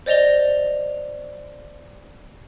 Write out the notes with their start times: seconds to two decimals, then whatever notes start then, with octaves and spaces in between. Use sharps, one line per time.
0.06 C5 D5 D#5 F7 G7